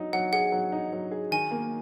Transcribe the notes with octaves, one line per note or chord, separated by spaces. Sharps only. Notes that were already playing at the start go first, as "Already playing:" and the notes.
Already playing: F#3 D#4
F#3 F#5
G#4 F#5
F#3
D#4
F#3
G#4
D#3 G#5
A#3